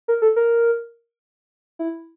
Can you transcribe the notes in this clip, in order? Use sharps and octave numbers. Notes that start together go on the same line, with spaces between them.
A#4
A4
A#4
E4